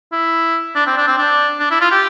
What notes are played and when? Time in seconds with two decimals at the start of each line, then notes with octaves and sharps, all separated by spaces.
0.12 E4
0.76 D4
0.87 C4
0.97 D4
1.07 C4
1.18 D4
1.60 D4
1.71 E4
1.81 F4
1.91 G4